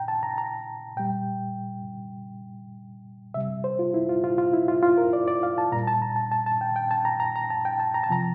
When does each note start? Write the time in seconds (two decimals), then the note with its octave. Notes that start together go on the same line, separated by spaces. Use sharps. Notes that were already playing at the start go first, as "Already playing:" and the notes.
Already playing: A#2 G5 A#5
0.08 A5
0.23 A#5
0.38 A#5
0.97 A#2 G3 G5
3.34 C3 G3 E5
3.64 C5
3.79 F4
3.94 E4
4.09 F4
4.24 F4
4.38 F4
4.53 E4
4.68 F4
4.82 F4
4.98 A#4
5.13 D5
5.28 D5
5.43 F5
5.58 A5
5.72 A#2 G3 A#5
5.87 A5
6.02 A#5
6.16 A5
6.32 A5
6.46 A5
6.61 G5
6.76 G5
6.91 A5
7.05 A#5
7.20 A#5
7.36 A#5
7.50 A5
7.65 G5
7.80 A5
7.94 A#5
8.04 A5
8.09 C3 F3 A#5